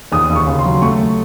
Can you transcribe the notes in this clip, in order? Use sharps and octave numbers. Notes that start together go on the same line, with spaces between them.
D#2 D#6
D#2
C#6
C#3
C6
F#3
A3 C#6